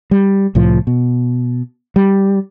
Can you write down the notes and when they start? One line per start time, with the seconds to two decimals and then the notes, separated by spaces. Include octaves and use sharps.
0.11 G3
0.55 C2 A2 F3
0.87 B2
1.96 G3